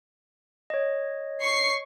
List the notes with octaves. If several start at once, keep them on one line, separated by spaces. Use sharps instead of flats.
C#5 D#5
C#6 C7